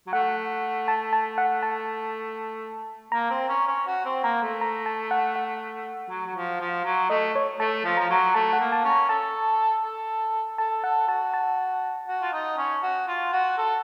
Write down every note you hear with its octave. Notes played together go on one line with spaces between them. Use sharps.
F#3
A3 F#5
A5
A5
F#5
A5
A#3 A#5
C4
C#4
C#4
F#4
C4
A#3 A#5
A3
A#5
A5
F#5
F#5
F#3
F#3
F3
F3
F#3
A3 D#5
C#5
A3 A5
F3
F3 A#5
F#3
A3 A5
F#5
A#3
A5
C#4
A#5
A4 A5
A4
A4 A5
A4 F#5
F#4 A5
A5
F#4
F4
D#4
C#4
F#4
F4
F#4
A4